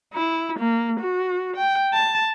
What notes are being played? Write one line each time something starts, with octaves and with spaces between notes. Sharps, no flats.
E4
A#3
F#4
G5
A5